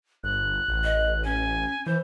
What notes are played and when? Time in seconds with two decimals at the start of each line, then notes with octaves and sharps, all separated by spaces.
0.24 G1 F#6
0.68 A1
0.84 D#5
1.25 C#4 G#5
1.86 E3 C5 G6